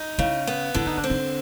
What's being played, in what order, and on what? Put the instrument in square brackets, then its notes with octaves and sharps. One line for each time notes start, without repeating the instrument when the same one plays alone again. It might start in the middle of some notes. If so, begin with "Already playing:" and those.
Already playing: [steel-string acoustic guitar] D#4
[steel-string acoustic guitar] C#3 [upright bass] E4
[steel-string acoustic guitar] B3
[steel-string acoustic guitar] D3 [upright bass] E4
[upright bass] D#4
D4
[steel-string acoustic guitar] C4
[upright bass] D#4